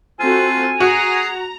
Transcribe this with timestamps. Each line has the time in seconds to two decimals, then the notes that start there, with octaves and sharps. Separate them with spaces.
0.20 C4 F4 F#4 A4 G#5
0.80 F#4 G#4 A#5